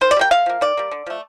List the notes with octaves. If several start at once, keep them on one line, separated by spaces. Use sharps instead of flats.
D#3 C5
D5
G3 A#3 G5
D3 F5
F3 A#3
D#3 D5
G3 A#3
D3
F3 A3